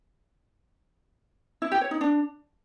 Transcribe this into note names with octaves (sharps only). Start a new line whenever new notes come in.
E4
G4
C#5
D#4
D4